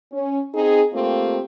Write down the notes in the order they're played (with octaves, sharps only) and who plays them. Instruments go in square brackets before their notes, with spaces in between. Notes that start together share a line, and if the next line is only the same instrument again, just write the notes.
[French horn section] C#4
C4 D#4 G#4
A3 A#3 C4 F4 G4